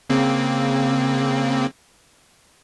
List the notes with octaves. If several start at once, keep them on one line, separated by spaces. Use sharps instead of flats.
C#3 A#3 C4